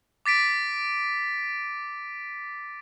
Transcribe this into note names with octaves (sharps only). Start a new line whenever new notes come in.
D6 A6 B6 D7